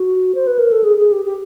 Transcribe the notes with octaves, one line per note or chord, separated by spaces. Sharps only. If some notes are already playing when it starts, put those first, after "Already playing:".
Already playing: F#4
C5
B4
A#4
A4
G#4
G#4
G4
G4